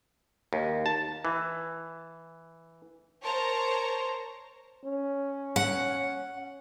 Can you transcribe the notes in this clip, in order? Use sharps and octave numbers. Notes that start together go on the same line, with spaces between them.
D#2
A5
E3
A#4 C5 C#5 A5 A#5 C6
C#4
F#5